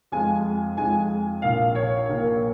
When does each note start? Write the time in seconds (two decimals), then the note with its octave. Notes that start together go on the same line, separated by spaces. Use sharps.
0.12 F2 F3 G#3 G#5
0.77 F2 F3 G#3 G#5
1.42 A#1 A#2 A#3 F5
1.75 C#5
2.08 A#1 A#2 A#3